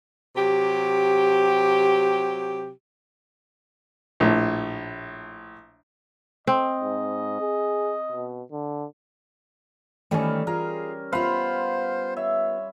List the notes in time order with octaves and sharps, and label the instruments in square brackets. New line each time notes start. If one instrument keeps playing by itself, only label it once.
[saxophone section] C3 F#3 G4
[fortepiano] A#1 A2
[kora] C4 [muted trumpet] D#5
[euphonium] G#2
G#4
B2
D3
[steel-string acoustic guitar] D#3 E3 A3 [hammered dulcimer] G3 C#4
[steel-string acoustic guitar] F4 [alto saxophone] G#4 [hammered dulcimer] A#4
[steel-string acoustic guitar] B3 F4 [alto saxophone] C5 [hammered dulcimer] F5 B5 C6
[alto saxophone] C#5 [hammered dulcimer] E5